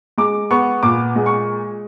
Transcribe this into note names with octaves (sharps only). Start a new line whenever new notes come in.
G#3 D6
B3 C#6
A#2 D6
G#3
C#6